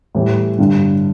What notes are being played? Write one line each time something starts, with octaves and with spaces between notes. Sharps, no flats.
A2 E3 G3
G2 D3 G3